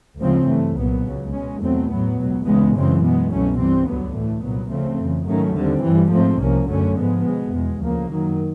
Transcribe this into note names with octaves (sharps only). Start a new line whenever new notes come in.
D2 C#3 F3 G#3 C4
G2 E3 A3
C2 A#2 F#3 B3
C#2 C#3 F#3
B2 G#3 C#4
E2 B2 F#3 A3 C4
A2 F#3 B3
C#2 B2 F#3
C#2 C#3 E3 G#3 B3
F#2 C#3 E3 G#3 C4
B2 G#3 B3
C2 B2 F#3 A3 C#4
G2 E3 G3 C4
D2 D3 F#3 B3
A2 E3 A3
C2 A#2 F#3 B3
D2 C#3 F3 A3 C4
F2 C#3 E3
G#2 D#3 F#3 A3 C#4
D#2 D3 G3 C4
G2 E3 G3
G#2 F3 A3 C4
C2 C3 F3 A#3 C#4
F#2 D3 F#3 A3 C#4
G#2 F3 G#3 B3
B2 G#3 B3
E2 B2 G#3
D2 C#3 F3 A#3
F#2 D#3 F#3